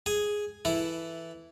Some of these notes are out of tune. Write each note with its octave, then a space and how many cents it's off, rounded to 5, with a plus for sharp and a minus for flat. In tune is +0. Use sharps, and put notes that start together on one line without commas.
G#4 +0 G#5 +0
E3 +5 E4 +0 A4 +0